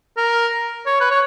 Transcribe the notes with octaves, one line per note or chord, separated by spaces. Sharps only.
A#4
C#5
B4
C#5